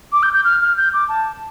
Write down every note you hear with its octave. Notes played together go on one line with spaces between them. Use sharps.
D6
G6
G6
F6
F6
G6
D6
A5